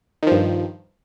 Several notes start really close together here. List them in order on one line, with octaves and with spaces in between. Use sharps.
D#3 F3 G2